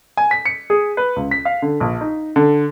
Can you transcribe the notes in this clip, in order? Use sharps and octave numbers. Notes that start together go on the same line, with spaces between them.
G#5
B6
C#7
G#4
B4
C#2
B6
F5
D3
A#1
D#4
D3